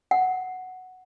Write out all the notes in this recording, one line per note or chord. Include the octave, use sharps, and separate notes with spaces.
F#5